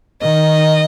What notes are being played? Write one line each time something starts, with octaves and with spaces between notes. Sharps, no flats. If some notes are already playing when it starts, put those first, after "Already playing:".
D#3 D#5